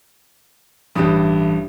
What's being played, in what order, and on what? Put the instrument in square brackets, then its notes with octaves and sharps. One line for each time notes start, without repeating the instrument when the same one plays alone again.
[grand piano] A1 G2 D#6 [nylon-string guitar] D4 E4 G4